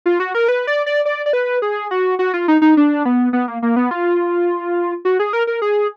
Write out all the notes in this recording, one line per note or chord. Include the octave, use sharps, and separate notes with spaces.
F4
F#4
A#4
B4
D5
D5
D5
D5
B4
G#4
F#4
F#4
F4
D#4
D#4
D4
B3
B3
A#3
A#3
B3
F4
F#4
G#4
A#4
A#4
G#4